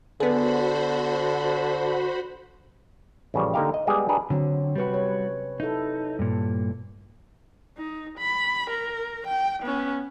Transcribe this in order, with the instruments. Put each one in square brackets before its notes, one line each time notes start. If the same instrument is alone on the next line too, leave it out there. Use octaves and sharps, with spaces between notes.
[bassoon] D3 [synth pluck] B3 G#4 [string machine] F#4 C5 B5
[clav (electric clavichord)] A1 C#3 F3 G3
D3 A#3 D#4 G4 F5
D#5
G3 G#3 B3 G4 G#4
D4 G4 G#4 A#4 B4
[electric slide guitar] D3 [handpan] F#3 C4
[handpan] C3 B4 [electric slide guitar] G3 F#4
[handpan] C#5
[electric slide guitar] D#4 [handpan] E4 A4
[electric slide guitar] G2 A#2
[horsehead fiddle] D#4
B5
A#4
G5
B3 C#4